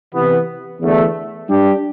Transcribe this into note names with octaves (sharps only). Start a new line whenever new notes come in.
C3 E3 B3
E2 D3 A3
G3 D4 G4